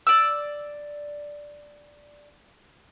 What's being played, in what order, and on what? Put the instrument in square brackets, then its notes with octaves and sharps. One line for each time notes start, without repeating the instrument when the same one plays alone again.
[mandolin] D5 E6